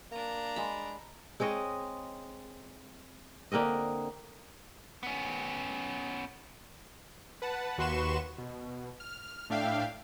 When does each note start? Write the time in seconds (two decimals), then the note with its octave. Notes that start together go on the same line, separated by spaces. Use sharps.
0.11 A#3 D4 A#5
0.56 G#3 B5
1.40 G#3 C4 C#5 D#5
3.52 D3 A#3 C4 D#5
5.03 B3 C#4
7.42 B4 F#5 A5
7.78 D#2 F#4 B4 C6 C#6 E7
8.38 B2
9.00 F6
9.50 A2 D4 E5 F5 G5